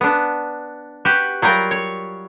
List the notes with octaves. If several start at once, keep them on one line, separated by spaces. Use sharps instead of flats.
B3 D4
F#4 G4 B4
F#3 G3 F4 A#4
C#5